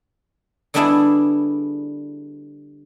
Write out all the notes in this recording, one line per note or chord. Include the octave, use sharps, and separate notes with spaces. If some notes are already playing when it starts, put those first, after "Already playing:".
D3 G3 B3 D4 E4 G#4